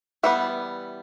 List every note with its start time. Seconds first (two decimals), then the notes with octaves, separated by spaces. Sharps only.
0.23 E3 G3 B3 E5